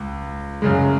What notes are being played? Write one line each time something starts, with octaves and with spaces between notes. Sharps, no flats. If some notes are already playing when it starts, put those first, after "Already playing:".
Already playing: C#2
F#2 C#3 G#3